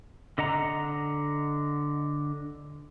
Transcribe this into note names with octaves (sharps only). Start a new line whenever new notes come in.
D3 D#5 F#5 A#5